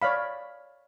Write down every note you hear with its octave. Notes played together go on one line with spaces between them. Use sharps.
C#5 D5 F5 B5